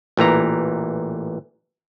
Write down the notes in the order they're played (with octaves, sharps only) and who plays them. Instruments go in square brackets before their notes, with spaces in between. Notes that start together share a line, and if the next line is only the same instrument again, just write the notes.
[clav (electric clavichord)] A1 A#2 E3 A#5